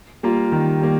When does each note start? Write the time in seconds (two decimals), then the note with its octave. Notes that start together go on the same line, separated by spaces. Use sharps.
0.23 G3 A#3 F4
0.52 D#3
0.81 G3 A#3